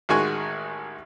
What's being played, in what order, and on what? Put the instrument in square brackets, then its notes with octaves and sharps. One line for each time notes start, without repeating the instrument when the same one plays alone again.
[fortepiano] A1 D#3 G#3 F#4 G#5 C#6